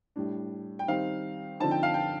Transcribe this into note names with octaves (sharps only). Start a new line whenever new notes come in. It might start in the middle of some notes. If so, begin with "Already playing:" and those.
A2 G3 D4
G5
D#3 G3 C4 D#4 F5
D3 F3 C4 D#4 A5
G5
F5
G5